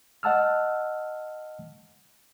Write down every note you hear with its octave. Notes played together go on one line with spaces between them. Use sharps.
D#5 F#5 A5 E6 F6